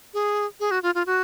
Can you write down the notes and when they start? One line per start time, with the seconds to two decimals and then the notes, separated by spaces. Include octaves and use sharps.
0.14 G#4
0.60 G#4
0.71 F#4
0.83 F4
0.95 F4
1.06 F#4